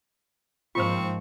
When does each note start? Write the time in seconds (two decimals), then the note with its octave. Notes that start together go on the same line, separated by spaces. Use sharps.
0.75 G#2 D#3 F3 A#3 C4 F4 C5 C#6